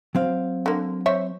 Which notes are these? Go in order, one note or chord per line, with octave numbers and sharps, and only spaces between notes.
F#3 C4 F5
D3 A#3
C5 C#5 E5